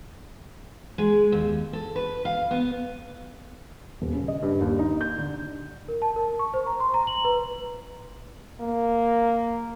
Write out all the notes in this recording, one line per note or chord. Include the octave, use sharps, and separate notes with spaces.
G#3
D#2
A4
B4
F5
B3
D#1
C#3
D#5
G2
D#2
D#4
G6
D3
A#4
A5
A#4
C#6
C5
A#5
C6
A#5
F#7
B4
A#3